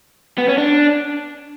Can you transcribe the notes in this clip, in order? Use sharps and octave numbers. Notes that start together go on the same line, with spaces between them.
B3
C#4
D4